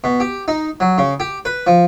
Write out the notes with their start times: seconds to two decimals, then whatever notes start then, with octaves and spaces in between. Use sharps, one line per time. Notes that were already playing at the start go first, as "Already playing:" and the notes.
0.04 B2
0.20 G4
0.48 D#4
0.80 F#3
0.98 C#3
1.20 G4
1.45 B4
1.67 F3